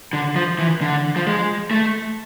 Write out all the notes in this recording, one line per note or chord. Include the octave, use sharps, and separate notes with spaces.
D3
F3
E3
D3
F3
G#3
A3